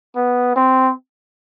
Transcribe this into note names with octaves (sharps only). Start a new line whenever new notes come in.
B3
C4